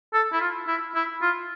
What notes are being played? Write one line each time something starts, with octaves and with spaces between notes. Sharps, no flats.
A4
E4
F4
E4
E4
F4